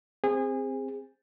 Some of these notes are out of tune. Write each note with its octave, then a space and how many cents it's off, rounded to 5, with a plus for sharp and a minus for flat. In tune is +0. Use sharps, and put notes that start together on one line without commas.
C4 +0 G#4 -30